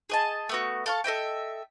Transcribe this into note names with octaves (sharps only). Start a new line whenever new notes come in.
G#4 D#5 A5
A3 B3 F#4
A4 F5 C#6
A4 D#5 E5 G5